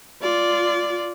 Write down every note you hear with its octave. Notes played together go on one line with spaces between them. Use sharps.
F4 D5